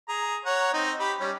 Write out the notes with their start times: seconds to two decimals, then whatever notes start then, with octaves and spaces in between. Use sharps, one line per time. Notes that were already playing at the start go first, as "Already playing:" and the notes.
0.09 G#4 A#5
0.45 C#5 F#5 A#5
0.73 C4 D#4
1.00 G4 B5
1.20 G3 C#4